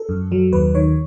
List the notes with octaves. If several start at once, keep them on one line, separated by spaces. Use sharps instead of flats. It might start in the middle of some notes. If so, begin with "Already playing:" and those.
Already playing: A4
F#2
F#3
D#2 B4
D#3 C#5